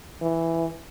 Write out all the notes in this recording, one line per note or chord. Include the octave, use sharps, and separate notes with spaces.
E3